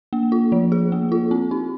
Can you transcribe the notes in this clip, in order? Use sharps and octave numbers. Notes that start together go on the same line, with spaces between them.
A#3
F4
F3
G#4
A#3
F4
C4
D#4